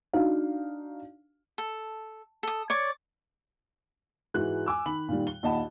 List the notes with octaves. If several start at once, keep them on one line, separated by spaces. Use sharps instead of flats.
D4 D#4 F#4 F5
A4
A4 D#6
C#5 D5 C#6
G#2 E3 G#3 F#4 F#6
G#5 D6 E6
D#3 B5 F#7
A#2 D#3 G3
G7
A#1 D#2 D#5 F#5 A5 B5